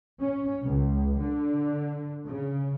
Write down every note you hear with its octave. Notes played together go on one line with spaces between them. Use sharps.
C#4
C#2
D3
C#3